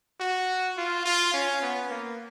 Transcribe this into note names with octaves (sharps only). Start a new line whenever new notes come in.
F#4
F4
F4
C#4
B3
A#3